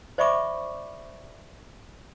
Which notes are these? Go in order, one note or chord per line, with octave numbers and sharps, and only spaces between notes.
C5 D5 E5 B5 C#6 D6